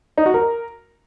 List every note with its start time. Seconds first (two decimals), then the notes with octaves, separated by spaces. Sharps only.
0.18 D#4
0.26 F#4
0.34 A#4